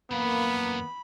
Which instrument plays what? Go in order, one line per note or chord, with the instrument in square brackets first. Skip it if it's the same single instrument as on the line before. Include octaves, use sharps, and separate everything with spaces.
[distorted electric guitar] F#2 E3 [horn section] A#3 [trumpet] B3 [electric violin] B5